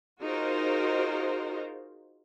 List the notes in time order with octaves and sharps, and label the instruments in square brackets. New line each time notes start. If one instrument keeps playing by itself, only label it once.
[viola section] D#4 F4 F#4 G#4 A#4 C5